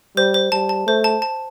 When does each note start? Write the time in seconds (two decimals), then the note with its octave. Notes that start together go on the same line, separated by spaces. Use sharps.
0.17 G3 C5
0.34 C5
0.52 G3 A5
0.69 A5
0.87 A3 C5
1.04 A5
1.22 A5